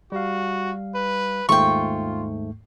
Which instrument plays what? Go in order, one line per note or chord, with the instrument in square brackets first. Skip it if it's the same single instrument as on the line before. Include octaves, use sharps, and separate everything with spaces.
[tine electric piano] G3 F5 [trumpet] F#4
[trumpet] B4
[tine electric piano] D#2 G#2 A3 [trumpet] F4 [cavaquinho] G5 C#6